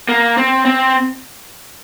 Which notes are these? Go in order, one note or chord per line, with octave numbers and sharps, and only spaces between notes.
A#3
C4
C4